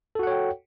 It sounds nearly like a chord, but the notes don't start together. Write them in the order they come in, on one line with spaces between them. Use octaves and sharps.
A4 F#4 F#5 C#5 G5